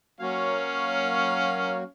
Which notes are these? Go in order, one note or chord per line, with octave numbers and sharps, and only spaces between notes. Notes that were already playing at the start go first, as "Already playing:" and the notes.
F#3 A#3 C#4 F#4 C#5 F5